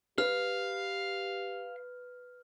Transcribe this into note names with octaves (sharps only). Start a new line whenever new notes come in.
G4 B4 F5 F6